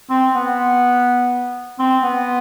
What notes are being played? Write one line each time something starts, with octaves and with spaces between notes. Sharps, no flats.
C4
B3
C4
B3